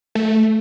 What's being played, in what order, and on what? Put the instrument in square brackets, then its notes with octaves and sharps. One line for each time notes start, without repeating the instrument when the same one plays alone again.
[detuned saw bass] A3